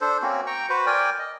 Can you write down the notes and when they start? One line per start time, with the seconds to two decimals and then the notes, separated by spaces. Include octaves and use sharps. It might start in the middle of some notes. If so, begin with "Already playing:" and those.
0.01 D4 A4 C5
0.22 A#3 C4 C#4 F#4
0.47 G5 A#5 C#6
0.69 F#4 B4 C5
0.87 A#4 D5 G5 G#5
1.19 D#5